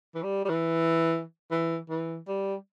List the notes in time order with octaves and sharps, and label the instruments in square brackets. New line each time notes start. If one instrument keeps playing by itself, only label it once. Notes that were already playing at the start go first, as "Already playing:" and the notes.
[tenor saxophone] E3
G3
G3
E3
E3
E3
G3